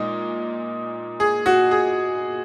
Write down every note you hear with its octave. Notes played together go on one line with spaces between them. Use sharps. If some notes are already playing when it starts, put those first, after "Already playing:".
Already playing: A#2 G#3 D#4
G#4
F#4
G#4